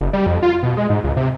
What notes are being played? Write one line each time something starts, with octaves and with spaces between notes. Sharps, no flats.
F#1
G3
F2
F4
B2
G#3
G#2
C#2
C3